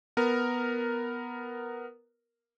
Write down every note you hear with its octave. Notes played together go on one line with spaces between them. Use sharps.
B3 A#4